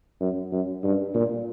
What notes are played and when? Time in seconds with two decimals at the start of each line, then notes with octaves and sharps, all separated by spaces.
0.20 F#2
0.52 F#2
0.83 G2
1.14 A#2